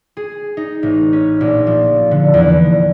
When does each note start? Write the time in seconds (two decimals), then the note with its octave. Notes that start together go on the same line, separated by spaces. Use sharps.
0.17 G#4
0.57 D#4
0.83 A1
1.13 C#4
1.41 A#1
1.67 F3
2.11 D3
2.34 E2
2.49 D3